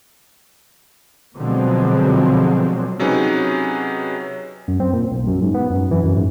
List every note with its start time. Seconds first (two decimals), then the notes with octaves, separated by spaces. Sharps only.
1.35 B2 D3 F3 F#3 G#3 C4
2.99 C3 F#3 C#4 D#4 G#4 B4
4.68 F#2
4.80 C4
4.93 A#2
5.12 B1
5.27 F#2
5.42 G#2
5.55 B3
5.70 F#2
5.91 E3
6.04 F#2
6.16 G#2